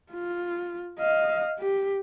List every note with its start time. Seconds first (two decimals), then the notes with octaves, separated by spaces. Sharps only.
0.12 F4
0.99 D#5 F5
1.59 G4